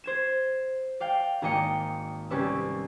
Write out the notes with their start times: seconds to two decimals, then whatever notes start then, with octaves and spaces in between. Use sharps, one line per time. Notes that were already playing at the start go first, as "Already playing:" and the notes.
0.04 C5 G#6 E7
1.00 D5 F5 G5
1.42 G#1 A#3 D5 D#5 G5 C#7
2.30 C2 C#4 B4 D5 E6